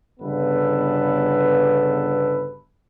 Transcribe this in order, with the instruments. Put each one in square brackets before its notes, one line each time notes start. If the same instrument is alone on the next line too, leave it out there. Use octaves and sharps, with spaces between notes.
[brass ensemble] G1 C#3 B3 A4 B4